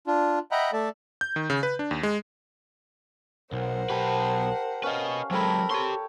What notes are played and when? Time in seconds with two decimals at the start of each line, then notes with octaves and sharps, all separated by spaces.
0.07 D4 F4
0.51 D#5 E5 F#5 G5 A#5 B5
0.73 A3 A4 D5 E5
1.21 G6
1.36 D#3
1.50 C#3
1.63 B4
1.79 D4
1.91 D#2
2.03 G#3
3.53 B1 A#4 C5 F#5
3.89 B1 G4 B4 A5
4.83 C#4 B4 D#5 F5
5.31 F#3 G#3 C4 A4 A#4 G5 B5
5.70 G4 C#5 G5 A5 C6